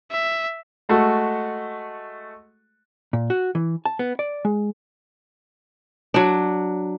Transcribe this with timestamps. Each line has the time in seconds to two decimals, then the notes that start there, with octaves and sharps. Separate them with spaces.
0.11 E5
0.89 G#3 A3 F#4 A4
3.13 A#2
3.30 F#4
3.55 E3
3.85 A5
3.99 B3
4.19 D5
4.45 G#3
6.14 F#3 D4